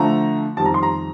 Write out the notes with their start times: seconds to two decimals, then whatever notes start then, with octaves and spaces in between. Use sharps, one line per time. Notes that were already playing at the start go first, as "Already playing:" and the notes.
Already playing: D3 F3 A3 A#5
0.57 F2 D#3 G3 C4 A5
0.66 A#5
0.74 C6
0.83 A#5